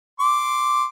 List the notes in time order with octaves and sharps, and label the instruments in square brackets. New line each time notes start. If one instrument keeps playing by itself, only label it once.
[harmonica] C6 D6